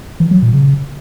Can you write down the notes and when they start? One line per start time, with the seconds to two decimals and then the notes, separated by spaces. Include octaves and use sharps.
0.20 E3
0.31 F#3
0.42 A#2
0.54 C#3